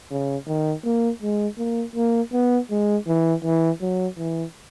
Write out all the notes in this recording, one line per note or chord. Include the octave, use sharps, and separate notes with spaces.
C#3
D#3
A#3
G#3
A#3
A#3
B3
G#3
E3
E3
F#3
E3